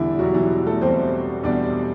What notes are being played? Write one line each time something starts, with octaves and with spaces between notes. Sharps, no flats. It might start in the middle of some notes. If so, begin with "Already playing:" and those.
Already playing: E2 B2 D3 E3 G3 D4 E4
E2 B2 F#3 G3 F#4
E3 E4
A3 A4
E2 B2 G3 C4 C5
E2 B2 G3 D4 D5